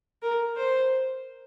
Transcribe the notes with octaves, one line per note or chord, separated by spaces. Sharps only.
A#4
C5